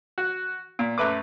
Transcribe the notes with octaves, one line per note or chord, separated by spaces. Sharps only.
F#4
A#2
F#2 A3 B4 D6